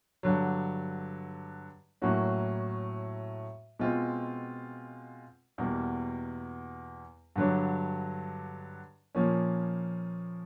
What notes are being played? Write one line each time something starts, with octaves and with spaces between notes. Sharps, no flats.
G2 D3 F#3
A2 F#3 A#3 C#4 F#4
B2 G#3 C4 F4
E2 B2 G3 A#3
G2 D3 F#3
A#2 F3 A#3 C#4